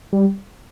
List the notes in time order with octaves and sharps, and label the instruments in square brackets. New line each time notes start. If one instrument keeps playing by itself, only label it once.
[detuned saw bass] G3